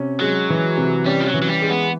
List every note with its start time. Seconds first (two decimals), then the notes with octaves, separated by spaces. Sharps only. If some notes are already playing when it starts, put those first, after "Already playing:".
Already playing: C3 C#4
0.21 F#3 G#3
0.50 E3
0.77 C3
1.06 G3 C#4
1.21 F3
1.27 F#3
1.34 E3
1.42 F#3
1.49 G3
1.62 G#3
1.70 B3